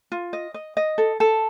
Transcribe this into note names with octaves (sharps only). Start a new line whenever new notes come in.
F4
D#5
D#5
D#5
A4
A4